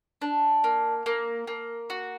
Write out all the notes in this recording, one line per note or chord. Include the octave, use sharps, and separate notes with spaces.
D4
A#3
A#3
A#3
F#4